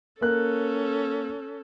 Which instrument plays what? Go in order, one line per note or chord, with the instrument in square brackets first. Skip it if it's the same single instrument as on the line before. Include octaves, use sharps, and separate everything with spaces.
[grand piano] A#3 A#4 F#6 [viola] C#4 A4